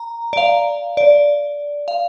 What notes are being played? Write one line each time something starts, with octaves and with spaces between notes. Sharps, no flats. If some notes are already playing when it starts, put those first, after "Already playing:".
Already playing: A#5
D5
F5
D5
F5